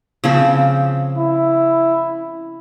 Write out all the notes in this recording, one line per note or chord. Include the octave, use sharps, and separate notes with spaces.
C#3 F3 C4
E4